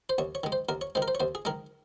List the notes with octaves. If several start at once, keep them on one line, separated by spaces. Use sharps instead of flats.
C5
D#2 C#5
C#5
D#3 G#3
C5
D#2 A#4
C#5
D#3 G#3 C5
A#4
C5
C#5
D#2 C5
G#4
D#3 G#3 A#4